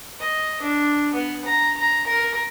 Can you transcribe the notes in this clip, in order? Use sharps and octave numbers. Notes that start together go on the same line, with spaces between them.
D#5
D4
B3
A#5
A#5
A#4